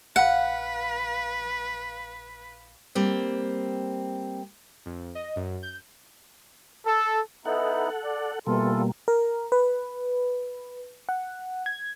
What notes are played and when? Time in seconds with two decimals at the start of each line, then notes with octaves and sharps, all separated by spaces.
0.16 A#1 B4 F5 F#5
2.95 G3 A#3 C4
4.86 F2
5.15 D#5
5.36 F#2
5.63 G6
6.86 A4
7.45 B3 D#4 E4 A4 F#5
8.04 D5
8.47 B2 E3 G3 A#3 F4 A4
9.08 A#4
9.52 B4
11.09 F#5
11.66 G#6